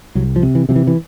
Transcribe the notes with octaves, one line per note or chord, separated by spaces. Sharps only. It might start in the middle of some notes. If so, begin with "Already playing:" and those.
C2 F#3
F3
C3
E3
C3 F3
E3
E3